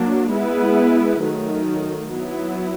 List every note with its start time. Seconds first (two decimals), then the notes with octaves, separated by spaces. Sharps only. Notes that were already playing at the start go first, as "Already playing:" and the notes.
Already playing: F#3 A#3 D4
0.31 G#3 B3 E4 G#4 B4
1.21 D#3 F#3 A3
2.11 F#3 B3 E4